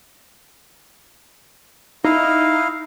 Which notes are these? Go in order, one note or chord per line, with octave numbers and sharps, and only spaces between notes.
D#4 E4 F5